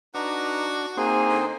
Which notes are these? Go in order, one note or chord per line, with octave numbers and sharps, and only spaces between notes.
D4 D#4 F#4 B4 A#5
A#3 C4 D#4 G#4 C5
D3